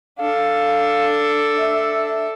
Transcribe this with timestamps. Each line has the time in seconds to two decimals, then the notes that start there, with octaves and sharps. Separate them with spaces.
0.19 D4 A4 F5
1.59 E5